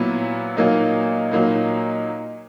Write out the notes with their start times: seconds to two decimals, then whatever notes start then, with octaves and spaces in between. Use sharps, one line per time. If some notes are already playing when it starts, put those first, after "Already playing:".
Already playing: A#2 F#3 B3 E4
0.57 A#2 F#3 A#3 D#4
1.32 A#2 F#3 A#3 D#4